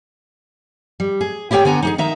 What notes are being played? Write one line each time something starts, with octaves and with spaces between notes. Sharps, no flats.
G3
G#4
E4 G4 G#4 C#5 G5
D3 B3 G#5 A#5
D#4 G4 G#4
D#3 D#4 E5 A#5